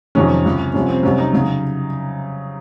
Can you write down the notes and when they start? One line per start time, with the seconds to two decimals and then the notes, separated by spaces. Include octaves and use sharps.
0.15 F2 C3 D#3 F#3 C#4
0.45 C#2 C3 F#3
0.73 C2 C3 F3 C#4
0.89 C4
1.03 C2 C3 F#3 C#4
1.18 D#4
1.33 C#3 F#3